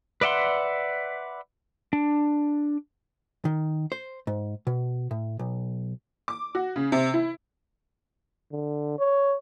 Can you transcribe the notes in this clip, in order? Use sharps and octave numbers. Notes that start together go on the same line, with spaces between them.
B4 D5 E5 F#5 C6
D4
D#3
C5
G#2
B2
A2
B1
D6
F#4
C#3
C3
E4
D3
C#5